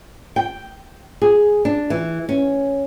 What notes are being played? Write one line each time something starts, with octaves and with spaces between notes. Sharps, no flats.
G5
G#4
D4
E3
C#4